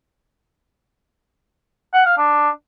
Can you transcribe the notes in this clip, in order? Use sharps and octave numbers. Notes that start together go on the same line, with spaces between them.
F#5
F5
D4